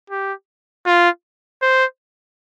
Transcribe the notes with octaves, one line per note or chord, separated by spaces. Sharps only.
G4
F4
C5